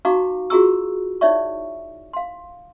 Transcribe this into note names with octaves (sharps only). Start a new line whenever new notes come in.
D#4 F#4 F5 A#5 C#6 D6
F4 F#4 G#4 A#5 C#6 E6
D#4 E4 C#5 D5 E5 C#6
F5 C6